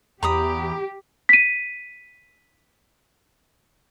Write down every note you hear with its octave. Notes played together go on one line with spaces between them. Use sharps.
E2 G4 A#5 B5 D#6
B6 D#7